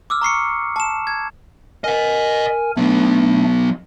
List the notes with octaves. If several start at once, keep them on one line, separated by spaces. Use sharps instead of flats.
D6 E6 F6
A#5 C#6 C7 C#7
A5 E7
G#6
A#4 D#5 F#5 G#5
F#3 A3 B3 D4